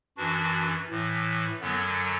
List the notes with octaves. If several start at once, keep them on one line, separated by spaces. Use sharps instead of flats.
F#2 E3 D4 F#4
A2 E3
F#2 D3 F#3 B3